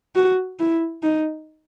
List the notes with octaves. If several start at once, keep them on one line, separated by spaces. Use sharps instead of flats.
F#4
E4
D#4